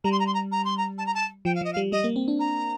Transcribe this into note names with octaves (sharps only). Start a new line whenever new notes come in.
G3 A#5
C6
A#5
C6
A#5
A#5
C6
A#5
A5
A#5
A5
F3 G5
F5
F3 D#5
F5
G3
G3 D#5
A#3
C4
D4
A#5